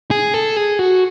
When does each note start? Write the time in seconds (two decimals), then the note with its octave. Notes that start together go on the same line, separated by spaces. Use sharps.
0.11 G#4
0.34 A4
0.57 G#4
0.79 F#4